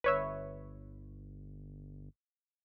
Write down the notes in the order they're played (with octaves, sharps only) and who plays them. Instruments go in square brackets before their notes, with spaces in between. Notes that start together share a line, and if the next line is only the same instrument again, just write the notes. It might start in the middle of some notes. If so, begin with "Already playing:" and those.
[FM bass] G1 [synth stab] B4 C#5 E5